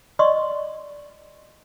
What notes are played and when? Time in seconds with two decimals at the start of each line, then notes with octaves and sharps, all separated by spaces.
0.19 D5 D#5 C6 C#6